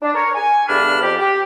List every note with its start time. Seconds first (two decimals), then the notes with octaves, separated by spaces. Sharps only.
0.02 D4
0.15 A#4 C#5
0.35 G#5
0.68 E2 G2 D3 D4 B5 F6
1.01 F2 G4
1.19 G4